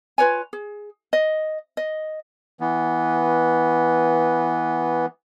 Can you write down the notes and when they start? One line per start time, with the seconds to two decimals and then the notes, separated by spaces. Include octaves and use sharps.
0.18 F4 B4 C#5 G#5
0.53 G#4
1.13 D#5
1.77 D#5
2.61 E3 B3